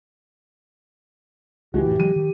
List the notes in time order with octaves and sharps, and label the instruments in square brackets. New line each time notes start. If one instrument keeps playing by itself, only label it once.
[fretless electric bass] C#2 G#3 [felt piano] E3 F#4 [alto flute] G4
[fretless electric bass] F1 A2
[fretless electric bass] E3 F#3 G#3 [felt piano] D#7
[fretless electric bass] D#3